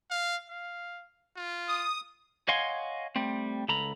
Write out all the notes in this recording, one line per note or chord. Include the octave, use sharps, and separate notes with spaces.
F5
F5
F4
D#6
C#5 D#5 F5 F#5 G#5 C6
G3 A3 C4
C#2 A4 A#5 B5